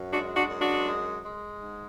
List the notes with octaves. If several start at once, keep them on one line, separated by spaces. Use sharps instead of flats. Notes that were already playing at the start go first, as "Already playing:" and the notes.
Already playing: F#2
G#3 D4 F#4
D4 F#4
F#2
D4 F#4
G#3
G#3
G#2